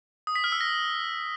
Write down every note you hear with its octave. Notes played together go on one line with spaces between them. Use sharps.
D#6
B6
F6
E6
A#6